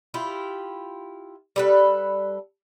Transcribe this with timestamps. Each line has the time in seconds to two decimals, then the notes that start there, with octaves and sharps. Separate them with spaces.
0.14 E4 F4 G4
1.56 G3 A4 B4